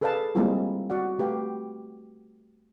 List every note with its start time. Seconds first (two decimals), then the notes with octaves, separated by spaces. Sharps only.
0.01 G#4 A4 B4 D5 F5 A5
0.35 G3 G#3 A#3 C4 E4 F4
0.90 F#4 D5 F#5
1.19 A3 G4 B4 F5